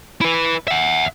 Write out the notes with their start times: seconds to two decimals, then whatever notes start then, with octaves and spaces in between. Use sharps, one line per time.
0.21 E4 B4
0.68 E5 F#5